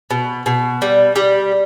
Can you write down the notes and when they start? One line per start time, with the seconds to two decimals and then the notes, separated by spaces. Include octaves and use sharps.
0.10 B2
0.46 B2
0.82 G3
1.16 G3